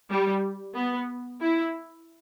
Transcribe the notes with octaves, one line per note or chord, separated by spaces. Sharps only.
G3
B3
E4